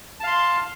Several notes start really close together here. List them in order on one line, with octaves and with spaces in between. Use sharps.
A5 F5 C6